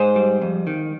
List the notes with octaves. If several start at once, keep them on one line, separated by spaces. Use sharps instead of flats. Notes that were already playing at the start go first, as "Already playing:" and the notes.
Already playing: G#2 G#4 C5
G3
F2
D#3